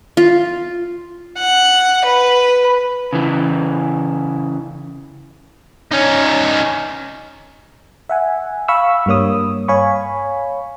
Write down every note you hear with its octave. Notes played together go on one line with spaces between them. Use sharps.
F4
F#5
B4
C#3 E3
C#4 D#4
E5 F#5 G#5
F5 B5 C#6 E6
G2 G3 A#3 C#5 D#6
C#5 F5 G#5 B5 C#6